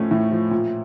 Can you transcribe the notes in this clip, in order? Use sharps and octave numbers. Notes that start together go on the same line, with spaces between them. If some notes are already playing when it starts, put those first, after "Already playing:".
Already playing: A2 F3 A3 C#4
A2
F3
A#2